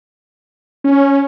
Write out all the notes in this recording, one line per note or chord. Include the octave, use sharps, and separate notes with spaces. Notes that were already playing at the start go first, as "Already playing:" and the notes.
C#4